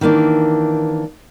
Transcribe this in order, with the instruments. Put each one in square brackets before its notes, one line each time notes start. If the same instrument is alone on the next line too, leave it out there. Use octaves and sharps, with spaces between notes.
[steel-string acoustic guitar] D#3 E3 A#3 D4